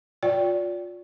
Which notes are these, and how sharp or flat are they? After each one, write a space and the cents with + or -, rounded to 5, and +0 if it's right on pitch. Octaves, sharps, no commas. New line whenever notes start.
F4 +25 D5 -25 G5 +0